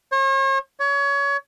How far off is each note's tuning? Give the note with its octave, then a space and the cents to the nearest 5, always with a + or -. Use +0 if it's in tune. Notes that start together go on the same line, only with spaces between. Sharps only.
C#5 -45
C#5 +25